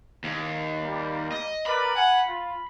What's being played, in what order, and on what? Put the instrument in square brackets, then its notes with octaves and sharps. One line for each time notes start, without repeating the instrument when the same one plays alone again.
[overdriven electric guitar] D#2
[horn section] G3 A#3
[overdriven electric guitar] D#5
[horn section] A#4 B4 D5 [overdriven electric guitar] B5
[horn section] F#5 G#5
F4